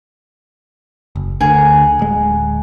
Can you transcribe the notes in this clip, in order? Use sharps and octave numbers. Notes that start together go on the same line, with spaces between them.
F#1
D2 D3 G#4 A#4 F#5
D1 G#3